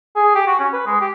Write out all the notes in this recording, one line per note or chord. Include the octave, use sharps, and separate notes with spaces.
G#4
G4
F#4
C#4
B4
G#3
G4